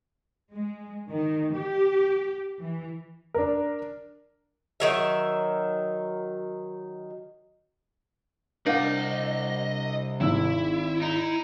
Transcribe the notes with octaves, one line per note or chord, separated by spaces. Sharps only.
G#3
D#3
G4
E3
D4 A#4
D#3 F#3 E5
C2 D4 A#4 D5 D#5 F5 F#5
G#1 E4 E6
D#4